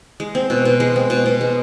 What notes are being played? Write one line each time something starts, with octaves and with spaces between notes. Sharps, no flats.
G#3
C4
B2
B2
G#3
C4
B2
B2
G#3